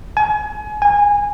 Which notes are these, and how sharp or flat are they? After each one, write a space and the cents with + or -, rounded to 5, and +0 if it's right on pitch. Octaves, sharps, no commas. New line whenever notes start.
G#5 +30
G#5 -20